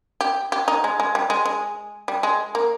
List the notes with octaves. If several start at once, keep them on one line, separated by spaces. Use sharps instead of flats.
G4
G4
D#4
G#3
G#3
G3
G#3
G#3
G3
G#3
A#3